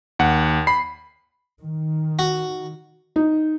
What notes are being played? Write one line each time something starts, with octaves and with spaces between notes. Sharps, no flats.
D#2 F#5
B5 C7
D#3
F#4
D#4